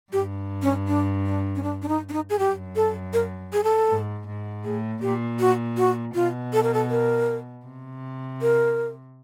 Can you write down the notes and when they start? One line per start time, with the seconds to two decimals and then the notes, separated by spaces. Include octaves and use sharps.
0.12 G2 G4
0.62 C#4
0.87 D4
1.26 D4
1.56 C#4
1.63 D4
1.82 D4
1.88 D#4
2.09 D4
2.13 D#4
2.30 G#4
2.39 F#2 G4
2.76 A4
3.14 A#4
3.53 G#4
3.64 A4
3.89 G#2
4.27 G#2
4.64 A2 G#4
5.02 A#2 G4
5.40 F#4
5.77 F#4
6.15 B2 F4
6.53 A4
6.63 A#4
6.74 A4
6.90 A#4
7.66 C3
8.42 A#4